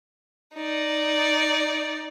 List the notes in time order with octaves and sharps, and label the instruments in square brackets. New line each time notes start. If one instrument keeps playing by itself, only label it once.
[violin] D#4 D5